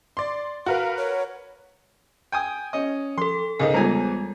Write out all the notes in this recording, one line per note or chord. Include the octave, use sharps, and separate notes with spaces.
D5 C6
F#4 A#4 B4 F5
C#5
G5 G#5 D#6
C#4 D#5
F3 A4 C6
C#2 G#2 D#4 A4 A#4 G#5
E2 G3 G#3 F4 G#5 A#5